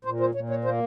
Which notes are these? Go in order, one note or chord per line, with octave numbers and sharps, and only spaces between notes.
A#2 C5
C5
A#2 C#5
C#5
A#3 C5